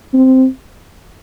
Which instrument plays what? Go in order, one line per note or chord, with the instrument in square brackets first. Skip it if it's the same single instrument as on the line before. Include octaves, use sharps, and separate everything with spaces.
[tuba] C4